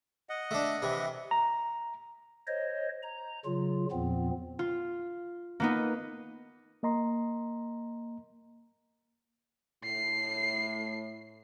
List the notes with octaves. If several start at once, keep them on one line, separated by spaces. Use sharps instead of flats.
D#5 F#5
A3 D4
C3 E3
A#5
C5 C#5 D#5
A#5
C#3 F#3 F4
E2 A#2 F3 B3 C4
F4
A#3 B3 D#4
A#3 D#5 A#5 C6
A2 C7